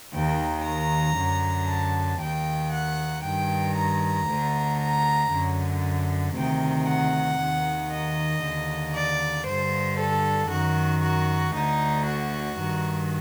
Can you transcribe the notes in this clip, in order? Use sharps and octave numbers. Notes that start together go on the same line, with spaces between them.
D#2 D#3 G5
A#5
F#2 D3
A5
D#2 D#3 G5
F#5
G2 D#3 G5
A#5
D2 D3
A#5
F#2 D3
D2 C3 D#3 G5
F#5
D#2 D#3
D#5
D#2 D3
D5
G2 D3 C5
A4
F#2 D#3 F#4
F#4
D2 D3 D#4
F#4
G2 D#3